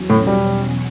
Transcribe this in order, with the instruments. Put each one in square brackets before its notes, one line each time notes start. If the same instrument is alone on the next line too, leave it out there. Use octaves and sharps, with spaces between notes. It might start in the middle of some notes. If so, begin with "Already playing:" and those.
Already playing: [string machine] E2 B2 F#3 C#4
[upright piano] A2
G3